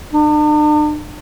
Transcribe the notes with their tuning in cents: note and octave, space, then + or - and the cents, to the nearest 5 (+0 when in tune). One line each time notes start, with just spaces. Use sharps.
D4 +45